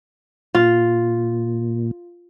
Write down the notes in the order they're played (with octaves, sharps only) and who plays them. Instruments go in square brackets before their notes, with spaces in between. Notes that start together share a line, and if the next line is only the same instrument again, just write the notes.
[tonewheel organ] A#2 [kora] F4